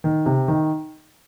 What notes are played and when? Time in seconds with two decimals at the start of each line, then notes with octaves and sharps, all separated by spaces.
0.04 D#3
0.26 C3
0.48 D#3